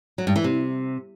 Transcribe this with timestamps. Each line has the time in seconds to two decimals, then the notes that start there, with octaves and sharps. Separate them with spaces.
0.18 F#3
0.27 G2
0.36 E3
0.44 C3